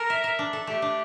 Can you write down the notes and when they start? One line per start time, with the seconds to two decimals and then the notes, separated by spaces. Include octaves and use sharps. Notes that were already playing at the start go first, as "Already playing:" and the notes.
Already playing: A4 A#4
0.10 E5
0.24 E5
0.39 D4
0.53 A4
0.67 A3 G4
0.82 D4